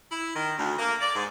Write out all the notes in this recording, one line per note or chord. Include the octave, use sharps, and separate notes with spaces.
E4
D#3
D2
A#3
D5
G#2